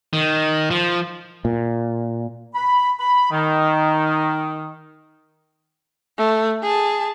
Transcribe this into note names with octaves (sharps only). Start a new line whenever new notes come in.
D#3
F3
A#2
B5
B5
D#3
A3
G#4 A5